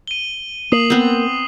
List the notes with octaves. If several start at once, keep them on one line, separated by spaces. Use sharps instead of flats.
D#7 G7
A#3 D#6 C7 F#7
B3 C4